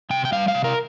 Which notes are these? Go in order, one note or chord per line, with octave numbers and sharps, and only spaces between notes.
C3 G5
G5
G3 F5
F5
C3
A#4